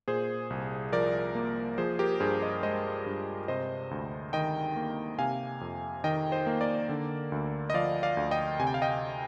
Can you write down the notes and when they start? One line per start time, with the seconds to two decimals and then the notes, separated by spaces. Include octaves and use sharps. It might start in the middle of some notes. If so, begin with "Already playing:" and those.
0.08 A#2 G#4 C5
0.50 C2
0.93 F3 A#4 D5
1.35 A#3
1.78 F3 G#4 C5
1.99 G4 A#4
2.20 G2 G#4 C5
2.42 C5 D#5
2.63 G#3 C5 D#5
3.06 G2
3.48 C3 C5 D#5
3.91 D2
4.33 D#3 D#5 G5
4.76 A#3
5.19 C3 F5 G#5
5.61 F2
6.04 D#3 D#5 G5
6.32 C5 D#5
6.47 A#3
6.61 A#4 D5
6.89 D3
7.32 D2
7.70 D#5
7.74 F3 D5 F5
8.03 D5 F5
8.17 D2
8.31 D#5 G5
8.60 C3 G#5
8.67 G5
8.74 F5
8.82 D#5 G5